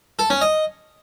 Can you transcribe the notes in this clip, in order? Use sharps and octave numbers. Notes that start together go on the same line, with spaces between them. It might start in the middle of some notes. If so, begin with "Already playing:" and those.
A4
C#4
D#5